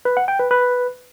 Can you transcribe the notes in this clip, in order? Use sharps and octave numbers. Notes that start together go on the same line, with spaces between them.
B4
F#5
G5
B4
B4